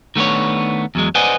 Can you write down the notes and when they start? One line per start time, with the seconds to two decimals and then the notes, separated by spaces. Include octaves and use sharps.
0.16 D#3 A3 B3 D4 C#5
0.95 E2 F#3 G#3
1.15 B4 C5 D5 D#5 F#5 G#5